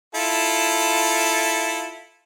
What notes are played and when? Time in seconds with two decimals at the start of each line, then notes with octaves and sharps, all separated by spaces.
0.15 E4 F4 A4